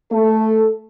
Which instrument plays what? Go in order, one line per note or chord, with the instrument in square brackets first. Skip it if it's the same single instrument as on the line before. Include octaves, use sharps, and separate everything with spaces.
[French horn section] A3 A4